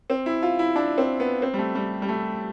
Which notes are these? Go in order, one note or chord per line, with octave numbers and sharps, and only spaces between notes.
C4
E4
F4
E4
D4
C4
B3
C4
G3
A3
G3
G3
A3